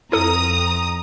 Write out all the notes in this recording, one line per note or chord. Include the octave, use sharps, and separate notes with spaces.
F2 E4 A4 A#5 D#6